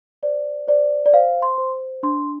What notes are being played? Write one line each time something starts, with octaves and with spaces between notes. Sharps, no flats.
C5 D5
C5 D5
D5
C5 F5
C6
C5
D4 C6